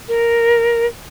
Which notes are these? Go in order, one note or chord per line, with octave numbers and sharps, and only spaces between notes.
A#4